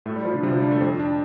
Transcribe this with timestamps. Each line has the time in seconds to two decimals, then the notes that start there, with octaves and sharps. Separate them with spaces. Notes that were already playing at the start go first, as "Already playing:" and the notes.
0.06 A2 A3
0.16 G3
0.25 F3 F4
0.34 D3
0.43 C3 G3
0.52 F3
0.62 G3 D4
0.71 A3
0.81 F2 C4
0.99 D4